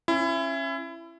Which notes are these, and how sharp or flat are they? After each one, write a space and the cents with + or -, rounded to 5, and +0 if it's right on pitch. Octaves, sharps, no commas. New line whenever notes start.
C#4 -25 E4 +25